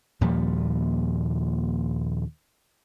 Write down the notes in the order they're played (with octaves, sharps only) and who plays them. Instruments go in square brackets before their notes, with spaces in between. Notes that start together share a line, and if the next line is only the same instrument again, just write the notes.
[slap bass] D#2 A#2 F3 G3